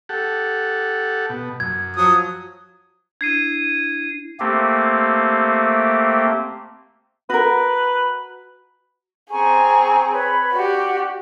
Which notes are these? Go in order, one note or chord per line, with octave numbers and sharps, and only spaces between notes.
G4 A4 F#5
B2
F#2 G#6
F3 F#3 D#6
D4 E4 G#6 C7 D#7
A3 A#3 C4 G4
F#4 A#4 B4
C4 G#4 G#5 A#5 C#6
B4 C#5 B5
F#4 G4 D5